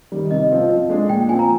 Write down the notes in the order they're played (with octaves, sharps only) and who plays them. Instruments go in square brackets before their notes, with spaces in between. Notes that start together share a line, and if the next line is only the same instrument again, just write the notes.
[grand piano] D#3 G3
[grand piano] C3 [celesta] D#5
[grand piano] F3 C4 F4
F3
G#3 D4 G#4
[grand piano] A#2 [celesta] G5
[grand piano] F3 [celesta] G#5
[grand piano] C4
[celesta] A#5